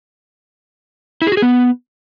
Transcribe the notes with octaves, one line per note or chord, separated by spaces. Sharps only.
E4
G#4
F#4
G#4
B3